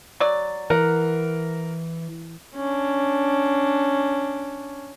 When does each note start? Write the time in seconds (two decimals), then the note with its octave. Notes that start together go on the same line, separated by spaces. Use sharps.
0.20 F#3 D5
0.70 E3 A#4 F#5
2.55 C#4 D4